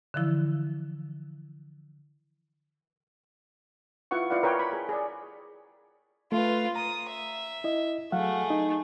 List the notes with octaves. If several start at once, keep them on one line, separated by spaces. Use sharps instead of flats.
D3 E3 F3 E4
E4 F4 B4 F#5 C#6
E4 F4 B4 D5 F5 F#5
A#4 B4 C#5 G5
B5
G#4
G#4 D5
A3 F4 B4
A#5 D#6
E5
E4 D#5
F#3 A3 G#4 F5 F#5
D#4